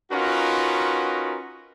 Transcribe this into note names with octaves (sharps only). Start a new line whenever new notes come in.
C#4 D#4 F4 F#4 A#4 B4